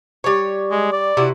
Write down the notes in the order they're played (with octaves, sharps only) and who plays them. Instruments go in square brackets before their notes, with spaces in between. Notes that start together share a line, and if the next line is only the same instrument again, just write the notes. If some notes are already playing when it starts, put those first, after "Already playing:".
[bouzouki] G3 C#5
[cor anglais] G#3
D5
[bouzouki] C3 E4 F#4